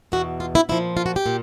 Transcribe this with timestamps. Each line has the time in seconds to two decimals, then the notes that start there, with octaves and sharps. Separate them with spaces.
0.12 E2 B2 F#4
0.40 F4
0.55 E4
0.69 A#2 F3 E4
0.97 F4
1.06 F#4
1.16 G4
1.26 A#2